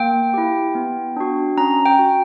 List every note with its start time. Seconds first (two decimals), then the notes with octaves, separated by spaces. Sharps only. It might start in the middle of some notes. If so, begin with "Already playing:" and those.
Already playing: A#3 G5
0.34 E4 G4
0.75 B3
1.17 D4 F#4
1.57 C#4 A#5
1.86 G5
1.99 F#4